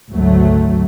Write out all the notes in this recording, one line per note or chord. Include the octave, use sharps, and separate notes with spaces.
G#1 D2 F#3 A3